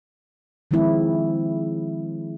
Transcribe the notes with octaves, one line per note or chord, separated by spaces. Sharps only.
D#3 F3 G#3 C4 E4